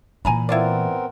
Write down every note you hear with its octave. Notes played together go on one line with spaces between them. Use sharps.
A#2 E3 G#5 A#5 B5
B3 C4 E4 F4 A#4 D5